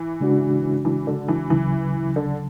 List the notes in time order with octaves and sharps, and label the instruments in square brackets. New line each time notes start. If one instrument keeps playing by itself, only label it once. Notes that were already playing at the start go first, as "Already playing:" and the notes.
Already playing: [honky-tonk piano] E3
[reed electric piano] C#3 G#3 D4 F#4
[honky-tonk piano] E3
D3
E3
[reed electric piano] D2 C#3 F#3 [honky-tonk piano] E3
[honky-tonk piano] D3